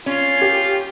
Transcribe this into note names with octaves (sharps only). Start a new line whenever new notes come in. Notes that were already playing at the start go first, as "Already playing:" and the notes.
C#4 F4
G4